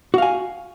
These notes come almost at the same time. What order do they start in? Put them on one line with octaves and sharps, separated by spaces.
F#4 F5 G#5